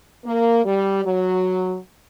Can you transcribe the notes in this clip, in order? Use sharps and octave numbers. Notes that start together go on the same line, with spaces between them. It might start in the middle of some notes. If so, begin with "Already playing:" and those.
A#3
G3
F#3